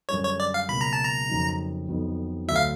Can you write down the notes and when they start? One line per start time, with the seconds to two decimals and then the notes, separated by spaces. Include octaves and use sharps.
0.09 F#2 D3 G3 C#5
0.24 C#5
0.40 D5
0.54 F5
0.69 C#2 B2 F#3 A#3 B5
0.81 A#5
0.93 A5
1.04 A#5
1.29 F2 C#3 F#3 A#3 D#4
1.88 F2 D3 F#3 B3 D#4
2.48 D2 D3 F#3 E5
2.56 F5